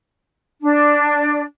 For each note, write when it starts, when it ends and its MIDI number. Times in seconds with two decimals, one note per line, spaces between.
0.62 1.42 62